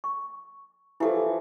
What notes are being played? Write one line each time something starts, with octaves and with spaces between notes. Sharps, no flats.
C#6
E3 F3 E4 G4 A4